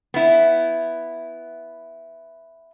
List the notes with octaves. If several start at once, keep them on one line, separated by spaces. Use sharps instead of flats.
B3 E4